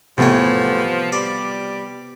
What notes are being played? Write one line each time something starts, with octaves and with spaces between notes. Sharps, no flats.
E2 A2 C3 F3 B3 C#5
G3 D5